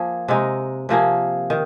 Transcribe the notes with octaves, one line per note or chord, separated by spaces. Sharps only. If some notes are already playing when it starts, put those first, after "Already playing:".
Already playing: F3 A#3 G#4
C3 G#3 D#4
C3 F3 A#3 G#4
D#3